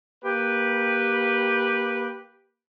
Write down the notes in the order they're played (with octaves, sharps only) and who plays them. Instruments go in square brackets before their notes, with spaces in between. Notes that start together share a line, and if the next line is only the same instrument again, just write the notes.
[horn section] A#3 G4 B4